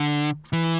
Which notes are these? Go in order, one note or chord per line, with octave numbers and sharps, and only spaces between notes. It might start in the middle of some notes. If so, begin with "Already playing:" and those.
Already playing: D3
E3